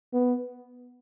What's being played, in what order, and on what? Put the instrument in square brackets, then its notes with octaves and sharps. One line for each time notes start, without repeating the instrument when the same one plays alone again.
[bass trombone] B3